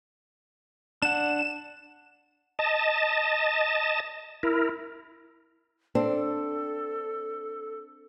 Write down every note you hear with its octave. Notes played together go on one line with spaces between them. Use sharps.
D4 F#5 E7
D#5 A5
E4 A#4
C4 D4 A4